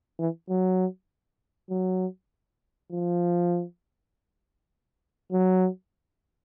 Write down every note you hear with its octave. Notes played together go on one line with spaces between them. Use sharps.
E3
F#3
F#3
F3
F#3